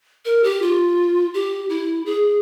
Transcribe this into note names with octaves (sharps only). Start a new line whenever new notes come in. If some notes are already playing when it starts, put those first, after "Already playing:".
A#4
G4
F4
G4
E4
G#4